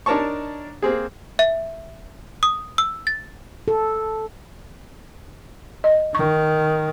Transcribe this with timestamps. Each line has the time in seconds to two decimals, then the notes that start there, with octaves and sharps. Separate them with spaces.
0.06 D4 D#4 A#4 C#5 A5 C#6
0.82 A#3 C4 G#4
1.39 E5
2.43 D#6
2.78 E6
3.07 A6
3.68 A4
5.84 D#5
6.15 D#3 C#6